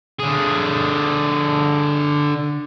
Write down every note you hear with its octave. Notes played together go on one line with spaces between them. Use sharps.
D3 G#4